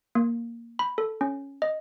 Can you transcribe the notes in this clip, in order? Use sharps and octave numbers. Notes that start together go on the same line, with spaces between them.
A#3
B5
A4
C#4
D#5